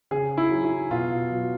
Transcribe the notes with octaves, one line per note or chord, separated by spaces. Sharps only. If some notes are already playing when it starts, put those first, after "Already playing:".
C#3 G#4
E4
F#3
E4
B2 F4
F#3